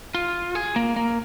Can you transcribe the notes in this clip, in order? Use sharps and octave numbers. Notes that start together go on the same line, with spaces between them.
F4
G#4
A#3
A#3